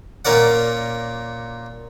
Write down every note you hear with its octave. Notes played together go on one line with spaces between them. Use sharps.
A#2 C#4 A#4 D5 F#5